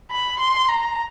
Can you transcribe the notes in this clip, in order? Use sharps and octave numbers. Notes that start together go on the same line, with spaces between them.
B5
C6
A#5